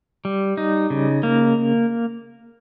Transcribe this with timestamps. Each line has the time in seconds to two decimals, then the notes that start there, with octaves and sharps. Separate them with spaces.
0.25 G3
0.57 D#4
0.90 C#3
1.23 A#3